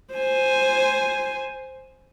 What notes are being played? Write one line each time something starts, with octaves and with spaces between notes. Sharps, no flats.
C5 G#5